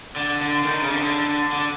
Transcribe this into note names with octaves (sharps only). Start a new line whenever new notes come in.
D3
D3
D#3
C#3
D3
D3